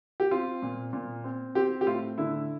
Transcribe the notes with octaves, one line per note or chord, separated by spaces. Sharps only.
G4
C4 F4
A#2
A#2
C4
C4 G4
G4
A2 F4
D3 E4